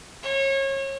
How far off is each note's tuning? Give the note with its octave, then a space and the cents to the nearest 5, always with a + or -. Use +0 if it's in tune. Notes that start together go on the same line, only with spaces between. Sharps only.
C#5 -30